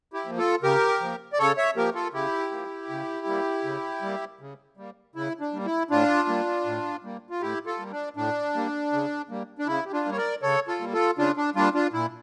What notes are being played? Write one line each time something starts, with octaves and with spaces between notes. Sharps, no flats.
E4 G4
F3 A#3
F4 A4
C#3 G4 A#4
F3 A#3
D5
C#3 A4 C#5
C#5 E5
F3 A#3 G4 A#4
F4 A4
C#3 E4 G4
F3 A#3
C#3
G3 A#3
C#3
G3 A#3
C#3
G3 A#3
C#3 E4
D4
G3 A#3
E4
A2 D4 F4
G3 A#3
A2
G3 A#3
F4
A2 E4 G4
F4 A4
G3 A#3
D4
A2 D4
G3 A#3
C#3
G3 A#3
D4
C#3 E4
G4
D4 F4
G3 A#3
C#5
A#4 D5
C#3 A4 C#5
F4 A4
G3 A#3
F4 A4
C#3 D4 F4
D4
G3 A#3 D4 F4
D4 F4
A#2 E4